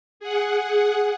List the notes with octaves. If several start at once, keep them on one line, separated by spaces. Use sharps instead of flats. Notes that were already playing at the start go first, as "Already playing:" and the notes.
G#4 F#5